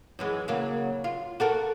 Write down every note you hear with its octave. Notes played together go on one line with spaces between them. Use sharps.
F#2 E3 G#3
C#3 F#3 A#3
F4
F#4 A4 A#4